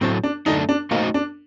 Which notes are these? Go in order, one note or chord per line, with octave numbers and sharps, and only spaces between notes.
A2 F#3 A3 C4
D4
F#2 D3 A3 D4 D#4
D4
A3 A#3 D#4 F#4 C5 D#5
D4